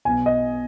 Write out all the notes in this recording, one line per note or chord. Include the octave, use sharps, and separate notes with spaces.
B1 B2 G#5
D#5